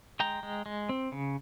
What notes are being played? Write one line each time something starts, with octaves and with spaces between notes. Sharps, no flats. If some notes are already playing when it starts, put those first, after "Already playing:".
G#3 G5 A#5
G#3
G#3
C4
C#3